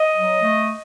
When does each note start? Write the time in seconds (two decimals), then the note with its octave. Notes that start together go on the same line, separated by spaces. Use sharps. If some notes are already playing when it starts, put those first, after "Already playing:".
Already playing: D#5
0.15 F#3
0.42 A3